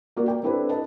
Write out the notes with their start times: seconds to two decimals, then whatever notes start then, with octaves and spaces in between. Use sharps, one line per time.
0.17 A#3 F#4 A#4 D5
0.28 G5
0.43 C4 D4 E4 G4 A4 B4
0.69 B4 D#5 A5